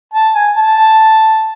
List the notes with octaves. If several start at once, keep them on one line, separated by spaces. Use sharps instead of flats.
A5
G#5
A5